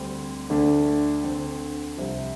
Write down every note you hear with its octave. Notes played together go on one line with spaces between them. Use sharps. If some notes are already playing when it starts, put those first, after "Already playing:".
Already playing: D2 D3 G3 C4
D2 D3 A3 D4
D2 D3 A3 C4
C2 C3 F3